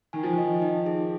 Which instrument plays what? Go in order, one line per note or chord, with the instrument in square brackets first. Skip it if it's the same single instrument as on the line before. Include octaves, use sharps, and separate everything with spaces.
[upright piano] D#3 [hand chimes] G#5
[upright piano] F3
[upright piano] D#3 [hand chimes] D#5
[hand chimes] D#4
G#4